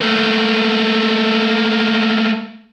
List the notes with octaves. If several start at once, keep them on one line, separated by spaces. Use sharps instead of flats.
A3 A#3